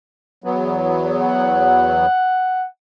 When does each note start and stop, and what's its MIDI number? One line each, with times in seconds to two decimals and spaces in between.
0.44 2.06 40
0.44 2.06 54
0.44 2.06 59
1.20 2.66 78